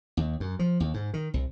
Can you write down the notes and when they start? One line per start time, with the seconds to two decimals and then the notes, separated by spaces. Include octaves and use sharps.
0.17 D#2
0.40 F#2
0.59 F3
0.80 D#2
0.94 G#2
1.14 D#3
1.34 C2